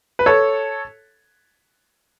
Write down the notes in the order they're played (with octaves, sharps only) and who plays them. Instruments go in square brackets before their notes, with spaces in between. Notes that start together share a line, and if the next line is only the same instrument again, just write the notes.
[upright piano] B4
A4 C#5